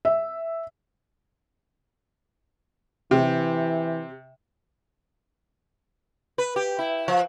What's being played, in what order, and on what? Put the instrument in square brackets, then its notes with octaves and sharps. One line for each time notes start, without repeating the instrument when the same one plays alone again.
[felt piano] E5
[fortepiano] C3 [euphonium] E3
[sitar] B4
G4
E4
F3